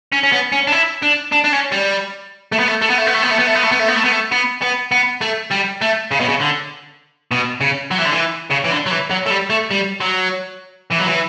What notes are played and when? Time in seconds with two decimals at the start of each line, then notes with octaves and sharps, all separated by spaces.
0.13 C#4
0.24 C#4
0.32 B3
0.52 C#4
0.67 D4
0.72 E4
1.03 D4
1.32 D4
1.44 D4
1.52 C#4
1.72 G3
2.52 A3
2.59 B3
2.68 A3
2.82 A3
2.90 B3
2.98 A3
3.07 B3
3.15 A3
3.23 B3
3.31 A3
3.39 B3
3.47 A3
3.55 B3
3.64 A3
3.72 B3
3.80 A3
3.88 B3
3.96 A3
4.04 B3
4.12 A3
4.32 B3
4.62 B3
4.91 B3
5.21 A3
5.51 G3
5.81 A3
6.11 C#3
6.20 B2
6.29 C#3
6.41 D3
7.31 B2
7.61 C#3
7.91 F#3
7.98 E3
8.05 D3
8.12 E3
8.51 C#3
8.65 E3
8.71 D3
8.86 F#3
8.91 E3
9.11 F#3
9.26 A3
9.30 G3
9.50 A3
9.71 G3
10.00 F#3
10.91 E3
10.98 F#3
11.06 E3